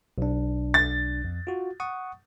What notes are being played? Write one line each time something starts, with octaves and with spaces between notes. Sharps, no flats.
B1 D4
A6
F2
F4 F#4
F#5 C#6 D#6